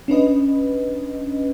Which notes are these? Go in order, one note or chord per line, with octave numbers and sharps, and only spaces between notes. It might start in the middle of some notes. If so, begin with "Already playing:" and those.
C#4 D4 B4 D#5